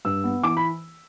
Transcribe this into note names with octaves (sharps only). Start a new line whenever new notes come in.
G2 E6
B3
E3 D6
B5